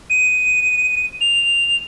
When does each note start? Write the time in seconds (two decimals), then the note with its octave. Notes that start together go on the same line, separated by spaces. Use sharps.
0.10 D#7
1.21 F7